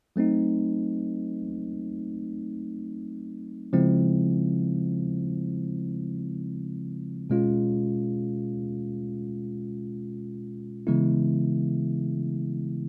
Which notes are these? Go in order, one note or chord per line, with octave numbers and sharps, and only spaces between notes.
F#3 A3 C4 D#4
C#3 F3 G#3 C4 E4
B2 G#3 C#4 F4
C#3 E3 G#3 B3 E4